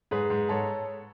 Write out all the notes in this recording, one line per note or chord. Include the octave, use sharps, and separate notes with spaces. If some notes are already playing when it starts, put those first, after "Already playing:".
G#2 G#4 B4
G#2
G#2 A4 C#5